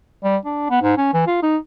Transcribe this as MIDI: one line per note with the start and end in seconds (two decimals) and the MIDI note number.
0.24 0.37 55
0.45 0.65 62
0.70 0.80 59
0.82 0.95 44
0.97 1.09 61
1.14 1.26 52
1.27 1.42 65
1.43 1.57 63